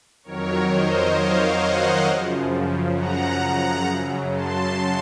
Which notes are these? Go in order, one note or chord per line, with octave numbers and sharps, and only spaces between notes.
F2 D#3 F#3 A#4 C#5
C5 D#5
C#5 F5
D#5 F#5
F#2 C#3 F3
F#5 A#5
F#5 A#5
F#2 C#3 F#3
A5 C6